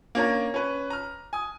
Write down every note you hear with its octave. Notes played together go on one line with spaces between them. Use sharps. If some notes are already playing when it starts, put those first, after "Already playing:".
A#3 C#4 D4 A#4
C#4 B4
A#5 F6
G#5 D#6